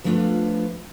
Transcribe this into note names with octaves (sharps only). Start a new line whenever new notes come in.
F3 G3 A3 B3 D4 F4